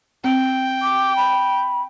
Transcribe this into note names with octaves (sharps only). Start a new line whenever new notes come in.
C4 G5
D6
B5